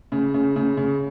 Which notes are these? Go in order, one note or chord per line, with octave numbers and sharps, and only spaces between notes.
C#3
C#3
C#3
C#3